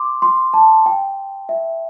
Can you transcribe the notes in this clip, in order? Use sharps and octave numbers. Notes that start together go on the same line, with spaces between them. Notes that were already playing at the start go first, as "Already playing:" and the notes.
Already playing: C6 D6
C6
A5
G5
E5